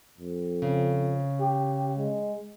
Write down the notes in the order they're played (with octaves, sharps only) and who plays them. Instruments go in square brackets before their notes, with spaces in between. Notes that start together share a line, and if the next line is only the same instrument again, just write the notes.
[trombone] F2
[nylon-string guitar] C#3
[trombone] G4
G#3